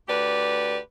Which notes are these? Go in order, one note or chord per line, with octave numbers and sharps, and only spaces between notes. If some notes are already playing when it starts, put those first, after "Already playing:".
D2 G4 B4 D5